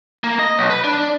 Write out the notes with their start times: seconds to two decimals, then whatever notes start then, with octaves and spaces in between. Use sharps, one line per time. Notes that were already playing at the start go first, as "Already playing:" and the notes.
0.24 A#3
0.39 D#5
0.58 B1
0.70 B4
0.84 D4